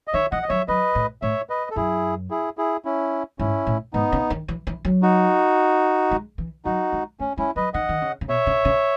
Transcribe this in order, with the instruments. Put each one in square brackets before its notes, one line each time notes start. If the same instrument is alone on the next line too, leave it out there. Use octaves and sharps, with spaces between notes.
[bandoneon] D#5
[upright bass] D#3 [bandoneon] C#5 E5
[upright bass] E3 [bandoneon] D#5 F#5
[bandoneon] D#5
[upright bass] F#3 [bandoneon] C#5 E5
[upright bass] F#3 [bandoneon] B4 D#5
[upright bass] A2
[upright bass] A2 [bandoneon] C#5 E5
[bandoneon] B4 D#5
A4
[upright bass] F#2 [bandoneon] E4 G#4
[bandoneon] E4 G#4
E4 G#4
C#4 E4
[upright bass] G#2 [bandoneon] C#4 E4
[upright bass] A2
[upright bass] G#2 [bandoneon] B3 D#4
[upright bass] C#3
D#3
E3
E3
F#3
[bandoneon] D#4 F#4
[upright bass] G#3
E3
[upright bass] F#3 [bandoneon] D#4 F#4
[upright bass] G#3
[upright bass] A3 [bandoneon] C#4
[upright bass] G#3 [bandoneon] C#4 E4
[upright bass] F#3 [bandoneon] B4 D#5
[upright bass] D#3 [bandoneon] D#5 F#5
[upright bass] D#3
C#3
C#3
[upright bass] B2 [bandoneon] C#5 E5
[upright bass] C#3
C#3